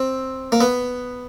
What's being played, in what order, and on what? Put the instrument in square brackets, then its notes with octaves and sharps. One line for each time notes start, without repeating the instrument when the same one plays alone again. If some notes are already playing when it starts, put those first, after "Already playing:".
Already playing: [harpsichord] C4
A#3
B3